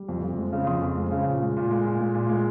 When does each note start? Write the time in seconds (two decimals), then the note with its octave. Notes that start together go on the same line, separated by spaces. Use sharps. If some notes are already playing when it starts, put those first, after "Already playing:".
Already playing: G3
0.09 F2
0.23 F2
0.37 G#3
0.52 C#3
0.67 F2 C6 D#6
0.82 F2
0.97 G#3
1.11 C#3
1.27 A#2
1.42 G#3
1.57 A#2
1.71 G#3
1.86 A#2
2.01 G#3
2.15 A#2
2.29 G#3